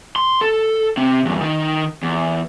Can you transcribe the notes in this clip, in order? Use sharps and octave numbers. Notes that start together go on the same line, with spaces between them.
C6
A4
C3 C4
E2 G2
D#3 D#4
E2